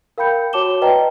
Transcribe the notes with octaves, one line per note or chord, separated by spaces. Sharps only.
A#4 F5 G5 B5 G6 C#7
F#4 C#5 A5 D6 E7 G7
B4 D5 D#5 G5 A5 A#5